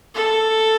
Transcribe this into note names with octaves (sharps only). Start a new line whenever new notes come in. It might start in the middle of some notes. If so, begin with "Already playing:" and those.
A4